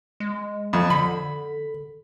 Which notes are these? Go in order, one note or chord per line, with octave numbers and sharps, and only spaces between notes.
G#3
F2
D3 B5